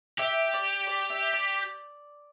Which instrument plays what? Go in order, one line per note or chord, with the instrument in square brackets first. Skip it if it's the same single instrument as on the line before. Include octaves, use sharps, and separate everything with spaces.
[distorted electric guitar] G4 [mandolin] E5
[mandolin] D5
D5
E5
D5